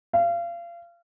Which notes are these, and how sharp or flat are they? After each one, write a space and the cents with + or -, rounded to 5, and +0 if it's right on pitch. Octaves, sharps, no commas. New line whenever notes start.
F5 -30